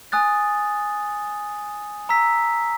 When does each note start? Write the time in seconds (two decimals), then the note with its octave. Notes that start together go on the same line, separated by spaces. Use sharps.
0.12 G#5 D#6 F#6 A6
2.09 A#5 E6 B6